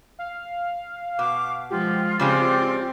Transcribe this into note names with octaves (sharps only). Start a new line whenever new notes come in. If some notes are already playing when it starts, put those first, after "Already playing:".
F5
B2 D6
F3 G#3 F4 G4
C#3 G3 G#3 C4 G4